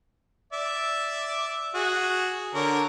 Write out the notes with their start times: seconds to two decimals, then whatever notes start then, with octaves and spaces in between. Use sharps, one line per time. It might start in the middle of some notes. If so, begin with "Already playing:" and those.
0.53 D5 E5
1.74 F#4 G#4
2.54 D3 A#4 C#5